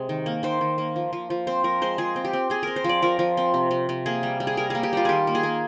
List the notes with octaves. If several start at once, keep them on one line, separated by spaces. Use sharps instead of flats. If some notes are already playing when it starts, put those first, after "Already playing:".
Already playing: C3 G#3 G#4
D#3
A#3
D#3 C5
D#3
A#3
F3
F3
F3
C4 C5
F3 A#4
G#3 C5
F3 G#4
C4
G4
C4
C4 G#4
C4 A#4
C5
F3 D5
F3 A#4
F3
C4
C3
C3
C3
A#3 G#4
G3
G3
G#4
G3 A#4
A#3 G#4
G4
G3 F4
D#3 G4 G#4
A#3
G#4
A#3